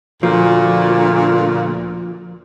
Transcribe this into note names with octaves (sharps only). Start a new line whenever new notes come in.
D2 A#2 F3